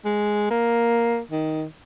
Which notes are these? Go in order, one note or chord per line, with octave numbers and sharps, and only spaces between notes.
G#3
A#3
D#3